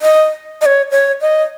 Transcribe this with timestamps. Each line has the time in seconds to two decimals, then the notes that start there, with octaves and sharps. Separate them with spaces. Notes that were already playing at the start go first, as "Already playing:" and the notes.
0.02 D#5
0.61 D#5
0.66 C#5
0.91 C#5
1.21 D#5